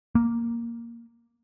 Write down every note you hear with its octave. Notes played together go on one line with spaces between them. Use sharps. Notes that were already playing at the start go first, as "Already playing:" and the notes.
A#3